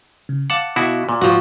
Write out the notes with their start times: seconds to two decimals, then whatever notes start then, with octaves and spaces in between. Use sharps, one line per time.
0.29 C#3
0.50 F5 F#5 A5 D6
0.76 B2 E4 F#4
1.09 A#2
1.21 G#2 F3 F#4